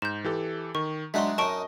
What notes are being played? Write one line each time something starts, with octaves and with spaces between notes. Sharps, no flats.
G#2 G6 E7
E3 G4 A4
D#3 C#6
F#3 G#3 D4 D#4 F#4 E5 C6
F#2 D#4 D#5 A5 C#6 D7